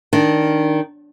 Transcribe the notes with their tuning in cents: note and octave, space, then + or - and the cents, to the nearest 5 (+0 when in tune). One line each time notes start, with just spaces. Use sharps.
D#3 +0 D4 -10